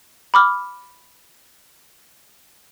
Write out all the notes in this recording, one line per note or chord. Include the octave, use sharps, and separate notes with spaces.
B5 D6 F6